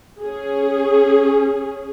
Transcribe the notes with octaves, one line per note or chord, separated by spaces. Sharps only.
C#4 G#4